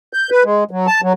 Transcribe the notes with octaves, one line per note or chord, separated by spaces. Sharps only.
G6
B4
G#3
F#3
A5
F#3